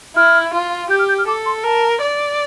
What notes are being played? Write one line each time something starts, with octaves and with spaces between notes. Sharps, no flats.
E4 F6
F4
G4 G6
F6
G6
F6
A4 D6
C6
A#4 A5
D5